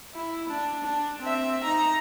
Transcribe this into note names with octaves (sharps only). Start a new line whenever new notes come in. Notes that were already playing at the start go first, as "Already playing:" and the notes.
E4
D4
D4
C4 E5
D#4 A#5